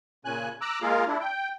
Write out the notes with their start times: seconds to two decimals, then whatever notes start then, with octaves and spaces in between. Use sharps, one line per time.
0.25 A#2 C#3 G#5 F#6
0.61 A#5 D6 E6 F#6
0.82 G#3 A#3 F4 G#4 A#4 F5
1.08 D4 E4
1.20 G5